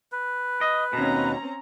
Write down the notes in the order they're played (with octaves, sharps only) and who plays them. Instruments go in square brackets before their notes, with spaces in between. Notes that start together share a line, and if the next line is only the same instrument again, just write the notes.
[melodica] B4
[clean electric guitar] D#5
[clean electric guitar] D#2 B2 [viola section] C4 C#4 A#5